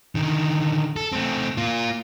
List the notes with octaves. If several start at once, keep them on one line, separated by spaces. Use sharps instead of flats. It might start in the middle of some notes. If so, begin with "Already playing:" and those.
D3 D#3
A4
A3 C4
A#3 F4